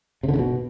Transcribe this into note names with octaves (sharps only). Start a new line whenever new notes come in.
C3
D3
C#3
B2